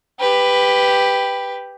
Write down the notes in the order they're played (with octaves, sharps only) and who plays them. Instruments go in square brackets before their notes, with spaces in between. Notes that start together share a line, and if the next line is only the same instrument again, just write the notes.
[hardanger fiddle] G4 B4